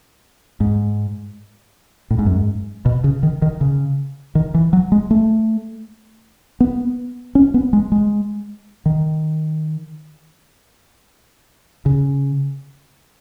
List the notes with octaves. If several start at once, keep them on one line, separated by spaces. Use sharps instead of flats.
G#2
A2
G#2
F#2
G#2
B2
C#3
D#3
D#3
C#3
D#3
E3
F#3
G#3
A3
B3
C#4
B3
G#3
G#3
D#3
C#3